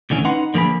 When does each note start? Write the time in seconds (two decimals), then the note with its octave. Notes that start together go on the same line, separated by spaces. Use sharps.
0.10 D2 D3 E3 C#4
0.25 C#4 D#4 B4 F#5 C6
0.54 D3 F3 A#3 G#4 B5